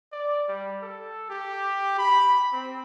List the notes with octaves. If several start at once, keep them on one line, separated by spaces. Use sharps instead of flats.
D5
G3
A4
G4
B5
C4